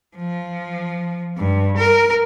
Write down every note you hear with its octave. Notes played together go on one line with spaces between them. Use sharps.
F3
G2
A#4